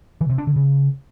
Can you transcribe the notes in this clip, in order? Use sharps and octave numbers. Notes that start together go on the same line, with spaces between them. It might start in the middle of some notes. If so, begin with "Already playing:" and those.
E3
C3
D4
D3
C#3